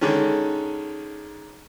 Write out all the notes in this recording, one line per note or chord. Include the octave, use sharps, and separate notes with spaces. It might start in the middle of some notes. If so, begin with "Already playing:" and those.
D3 D#3 G#3 C#4